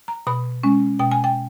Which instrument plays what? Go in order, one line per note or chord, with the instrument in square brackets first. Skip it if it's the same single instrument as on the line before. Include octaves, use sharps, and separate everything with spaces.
[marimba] A#5
B2 B5
G#3 C#4
B2 G5
G#5
G5